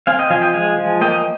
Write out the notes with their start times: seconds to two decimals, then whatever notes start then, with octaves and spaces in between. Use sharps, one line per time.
0.07 C4 F5 G#5
0.19 D#5 G5
0.30 F3 F5 G#5
0.42 D#5 G5
0.53 G#3 F5 G#5
0.78 F3
1.01 A#3 D#5 G5